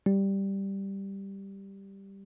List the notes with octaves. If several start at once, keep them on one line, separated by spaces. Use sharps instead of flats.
G3